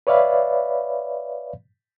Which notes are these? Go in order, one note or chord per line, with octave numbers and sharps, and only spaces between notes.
B4 C#5 D5 E5 F5 B5